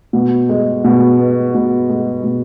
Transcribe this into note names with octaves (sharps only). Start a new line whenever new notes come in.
B2
G#3
B2
B3
B2
G#3
B2